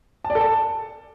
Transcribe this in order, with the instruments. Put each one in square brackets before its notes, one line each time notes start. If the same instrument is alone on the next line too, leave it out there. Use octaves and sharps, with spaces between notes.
[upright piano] A5
D5
A4
A5